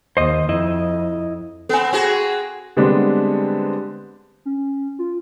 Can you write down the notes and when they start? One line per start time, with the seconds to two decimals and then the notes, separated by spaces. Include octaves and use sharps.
0.17 D#2 C5 D#5
0.49 F2 E4 D#5
1.69 B3 C4 A4 G#5
1.92 C4 F#4 G#4
2.77 D3 G3 G#3 B3 C4 D4
4.45 C#4
4.99 F4